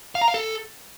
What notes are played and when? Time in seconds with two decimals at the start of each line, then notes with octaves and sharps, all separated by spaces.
0.15 F5
0.21 A#5
0.28 F5
0.34 A4